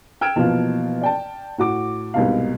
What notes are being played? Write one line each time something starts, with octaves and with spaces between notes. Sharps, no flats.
G5 E6 F6 G#6 D7 E7
B2 E3 F3 A#3 F4
D5 G5 A5
A2 F#4 D6
C2 G#2 B2 F5